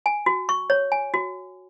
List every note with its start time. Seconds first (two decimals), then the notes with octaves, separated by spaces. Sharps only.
0.06 G#5
0.26 F#4
0.49 C#6
0.70 C#5
0.92 G#5
1.14 F#4